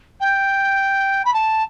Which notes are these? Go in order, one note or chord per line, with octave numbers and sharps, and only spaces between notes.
G5
B5
A5